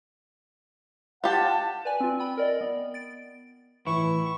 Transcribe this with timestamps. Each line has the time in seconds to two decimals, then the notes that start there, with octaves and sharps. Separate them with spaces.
1.24 F4 G4 F#5 A5
1.85 B4 D5 G#5
2.00 C4 F4
2.19 G5 B5
2.37 A#4 D5 D#5
2.61 B3
2.94 A6 D7
3.87 A2 E3 E4 C#6